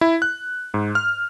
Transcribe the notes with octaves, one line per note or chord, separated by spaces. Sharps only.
E4
F#6
G#2
F6